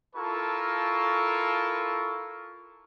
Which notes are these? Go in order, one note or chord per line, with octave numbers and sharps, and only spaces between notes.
E4 F4 A4 A#4 A5 C#6